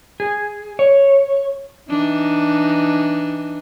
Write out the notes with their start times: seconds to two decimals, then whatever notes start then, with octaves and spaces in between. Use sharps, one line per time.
0.20 G#4
0.79 C#5
1.90 E3 D4 D#4